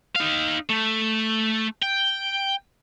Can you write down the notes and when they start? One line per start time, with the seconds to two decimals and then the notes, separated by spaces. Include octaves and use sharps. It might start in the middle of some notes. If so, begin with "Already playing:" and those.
0.16 D#4 F5
0.70 A3
1.83 G5